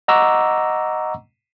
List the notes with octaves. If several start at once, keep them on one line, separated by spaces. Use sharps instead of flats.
D#5 F#5 A#5 C#6 D6 E6